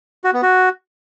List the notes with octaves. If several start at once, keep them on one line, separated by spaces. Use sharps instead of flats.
F#4
B3
F#4